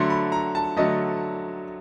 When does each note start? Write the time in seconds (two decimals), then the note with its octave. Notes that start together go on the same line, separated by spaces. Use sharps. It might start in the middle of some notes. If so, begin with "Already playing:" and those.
Already playing: D3 F#3 A3 C6
0.10 B5
0.32 A#5
0.55 A5
0.77 D3 F#3 A3 D#5